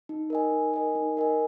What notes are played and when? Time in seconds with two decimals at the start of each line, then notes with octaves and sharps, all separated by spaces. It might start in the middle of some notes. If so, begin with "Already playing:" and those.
0.09 D#4
0.30 A#4 D#5 G#5
0.52 D#4
0.74 A#4 D#5 G#5
0.95 D#4
1.17 A#4 D#5 G#5